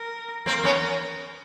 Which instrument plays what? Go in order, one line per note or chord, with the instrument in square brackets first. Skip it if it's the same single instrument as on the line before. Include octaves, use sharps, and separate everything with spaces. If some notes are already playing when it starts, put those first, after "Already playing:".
Already playing: [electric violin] A#4
[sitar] A#3 C4 [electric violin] A#4
[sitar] B3 C#4